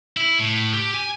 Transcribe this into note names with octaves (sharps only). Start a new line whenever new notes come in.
E4
A2
G4
G#5